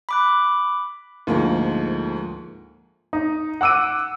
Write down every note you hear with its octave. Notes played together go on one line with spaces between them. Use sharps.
B5 D6 F#6
D2 G#2 F3 A#3
D#4
F#5 D6 E6 D7 D#7